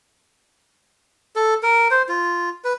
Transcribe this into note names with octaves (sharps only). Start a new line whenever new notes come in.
A4
A#4
C5
F4
B4